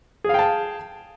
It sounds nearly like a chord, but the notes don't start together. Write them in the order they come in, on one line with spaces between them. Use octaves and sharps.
G#4 F5 G5 A5